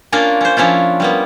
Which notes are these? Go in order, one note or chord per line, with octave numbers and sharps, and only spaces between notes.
A#3 C#4 D4 F4 A#4
C#4 C5
F3 C#4 D4 E4 F4
G3 A#3 B3